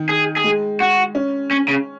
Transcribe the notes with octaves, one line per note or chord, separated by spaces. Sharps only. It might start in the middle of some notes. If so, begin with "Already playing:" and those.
Already playing: D#3
G#4
G#4
G#3
F#4
C#4
C#4
C#3